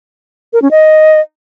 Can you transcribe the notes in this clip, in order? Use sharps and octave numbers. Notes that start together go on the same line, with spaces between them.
A#4
C#4
D#5